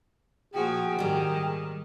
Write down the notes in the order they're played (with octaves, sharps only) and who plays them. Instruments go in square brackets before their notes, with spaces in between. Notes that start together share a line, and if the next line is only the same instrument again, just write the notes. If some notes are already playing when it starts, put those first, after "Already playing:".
[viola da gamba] A#2 F3 F#4 [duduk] G#4 [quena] G5
[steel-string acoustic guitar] G#2 G3 [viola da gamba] D#3 [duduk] G#4